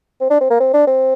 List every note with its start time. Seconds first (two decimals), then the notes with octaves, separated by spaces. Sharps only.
0.21 C4
0.30 D4
0.41 C4
0.50 A#3
0.60 C4
0.73 D4
0.87 C4